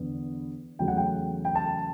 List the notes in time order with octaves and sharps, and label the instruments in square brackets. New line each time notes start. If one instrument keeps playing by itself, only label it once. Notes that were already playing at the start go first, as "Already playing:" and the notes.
Already playing: [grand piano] E2 D3 B3
E2 C#3 F#3 A3 G5
F#5
G5
G5
A5